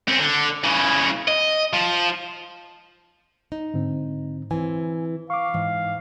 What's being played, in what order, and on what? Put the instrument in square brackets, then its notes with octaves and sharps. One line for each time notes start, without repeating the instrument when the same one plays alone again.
[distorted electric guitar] C4 C#4
D3
C#3 E3
D#5
F3
[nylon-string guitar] D#4
[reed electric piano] G#2 D3 C4
[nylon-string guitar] E3 C4 [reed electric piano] G#5
[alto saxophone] F5 [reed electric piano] C#6 D6
[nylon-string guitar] G#2 [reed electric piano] E3